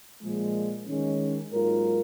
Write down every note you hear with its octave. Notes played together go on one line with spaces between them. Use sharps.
A#2 F3 G#3
D#3 G#3 C#4
G#2 F#3 A#3 F4 A#4